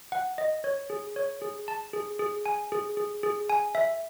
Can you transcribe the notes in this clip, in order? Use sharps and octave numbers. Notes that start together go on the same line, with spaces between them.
F#5
D#5
C#5
G#4
C#5
G#4
A5
G#4
G#4
G#5
G#4
G#4
G#4
G#5
E5